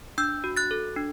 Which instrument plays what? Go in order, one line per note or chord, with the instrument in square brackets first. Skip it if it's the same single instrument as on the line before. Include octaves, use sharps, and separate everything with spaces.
[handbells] D4 E6 G6
F#4
F#6 A6
A4
D4